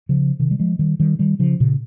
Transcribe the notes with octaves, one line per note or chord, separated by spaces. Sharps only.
C#3 F3
C3 D#3
G3
F3 G#3
D#3 G3
D#3 G3
D#3 G3
C#3 F3
A#2 C#3